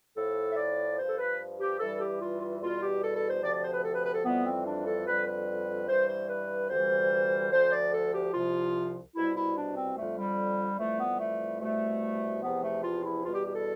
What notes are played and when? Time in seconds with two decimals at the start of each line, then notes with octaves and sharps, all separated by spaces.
0.16 A2 F3 A4
0.50 E5
0.57 D5
0.99 G2 F3 C5
1.09 A4
1.18 B4
1.60 G4
1.80 G2 E3 G3 A4
2.01 G4
2.21 F4
2.42 F4
2.61 E2 B2 G3 F4
2.82 G4
3.03 A4
3.16 A4
3.30 C5
3.43 D2 C3 F3 D5
3.53 D5
3.64 C5
3.74 B4
3.85 A4
3.95 B4
4.05 B4
4.15 A4
4.25 F2 E3 G3 B3
4.46 C4
4.67 D4
4.86 A4
5.07 F2 D3 G3 B4
5.27 B4
5.89 G2 E3 G3 C5
6.09 C5
6.29 B4
6.70 D2 C3 E3 G3 C5
7.52 D2 D3 F3 C5
7.72 D5
7.93 A4
8.13 G4
8.33 C2 C3 F3 F4
9.16 C2 B2 G3 E4
9.36 E4
9.56 D4
9.77 C4
9.97 F2 D3 G3 A3
10.18 G3
10.79 F2 E3 G3 A3
11.00 B3
11.20 A3
11.61 C2 B2 G3 A3
12.43 E2 C3 F3 B3
12.63 A3
12.84 F4
13.04 E4
13.24 E2 B2 G3 F4
13.34 G4
13.46 G4
13.55 A4